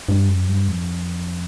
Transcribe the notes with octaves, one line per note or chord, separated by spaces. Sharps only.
G2
F#2
G2
F2